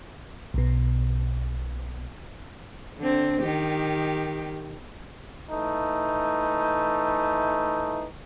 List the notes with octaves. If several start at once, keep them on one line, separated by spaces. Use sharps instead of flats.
B1 B2
D3 C4
D#3 G4
E3 A3 D#4